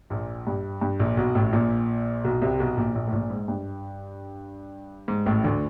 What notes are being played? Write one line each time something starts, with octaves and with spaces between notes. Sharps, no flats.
A#1 A#2
G2
G2
A#1 A#2
B1 B2
A1 A2
A#1 A#2
B1 B2
C2 C3
B1 B2
A#1 A#2
A#1 A#2
A2
A#1 A#2
G#2
G2
G#2
A1 A2
D2 D3